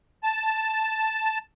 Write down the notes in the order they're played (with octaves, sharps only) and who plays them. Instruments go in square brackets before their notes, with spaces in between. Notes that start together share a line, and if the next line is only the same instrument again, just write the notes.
[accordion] A5